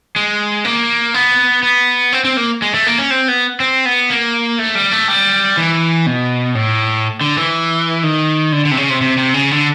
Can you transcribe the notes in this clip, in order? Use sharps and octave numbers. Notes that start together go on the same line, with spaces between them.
G#3
A#3
B3
B3
C4
C4
A#3
G#3
A3
A#3
C#4
C4
B3
C4
B3
A#3
A3
G3
A3
G3
E3
B2
A2
D3
E3
D#3
D3
D3
C3
C#3
C3
C3
C3
C#3
D3